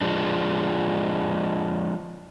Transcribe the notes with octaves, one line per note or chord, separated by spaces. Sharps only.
F3 G#3 D4